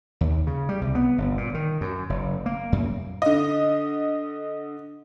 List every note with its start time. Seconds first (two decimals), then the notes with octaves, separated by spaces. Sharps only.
0.21 D#2
0.47 C#3
0.69 G3
0.81 C2
0.95 B3
1.18 G1
1.37 A#2
1.54 D#3
1.81 F#2
2.10 F#1
2.46 A#3
2.72 F#2
3.22 D3 D#5